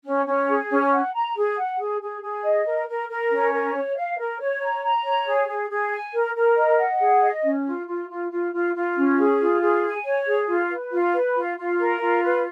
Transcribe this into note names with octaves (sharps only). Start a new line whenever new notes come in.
C#4
C#4
G#4
C#4
F#5
A#5
G#4
F#5
G#4
G#4
G#4
D#5
A#4
A#4
A#4
C#4
A#4
C#5
F5
A#4
C#5
A#5
A#5
C#5
G#4
G#4
G#4
G#5
A#4
A#4
D#5
F#5
G#4
D#5
C#4
F4
F4
F4
F4
F4
F4
C#4
G#4
F4
G#4
G#5
C#5
G#4
F4
B4
F4
B4
F4
F4
A#4
F4
B4